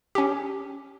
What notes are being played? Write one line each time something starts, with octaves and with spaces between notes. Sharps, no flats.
C#4 G4